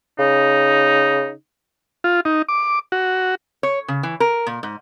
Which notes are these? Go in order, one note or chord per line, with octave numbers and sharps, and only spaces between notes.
C#3 D#4
F4
D#4
D6
F#4
C#5
C#3
E3
A#4
A#2
G#2